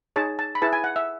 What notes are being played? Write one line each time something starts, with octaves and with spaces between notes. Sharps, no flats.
D#4 G#4 C#5 A5
A5
B5
E4 G#4 B4 A5
G#5
F#5
E5